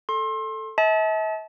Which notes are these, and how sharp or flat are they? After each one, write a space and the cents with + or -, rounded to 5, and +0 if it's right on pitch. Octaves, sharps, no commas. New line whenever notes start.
A4 +0 C6 +30
E5 -45 A5 -25